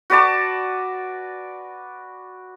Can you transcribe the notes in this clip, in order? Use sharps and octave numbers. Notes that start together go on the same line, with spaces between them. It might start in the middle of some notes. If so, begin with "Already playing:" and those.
F#4 B4 D5 A5